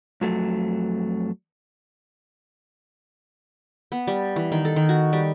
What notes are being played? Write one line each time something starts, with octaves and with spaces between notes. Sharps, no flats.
F2 F#3 A3
B3
G3
E3
D#3
A4
D#3
F#4
G3